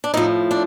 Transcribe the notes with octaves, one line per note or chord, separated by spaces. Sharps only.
D4
A2 F3 D#4
D4